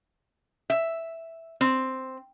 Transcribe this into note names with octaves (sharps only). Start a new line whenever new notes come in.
E5
C4